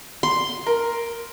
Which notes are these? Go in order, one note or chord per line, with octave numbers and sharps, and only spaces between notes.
C6
A#4